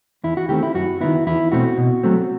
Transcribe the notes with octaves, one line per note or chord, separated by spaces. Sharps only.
E2 E4
F#4
D#3 A3 C4 G4
E4
F#2 F#4
D#3 F#3 B3 E4
E2 E4
B2 A3 C4 F#4
B2
F#3 A3 C4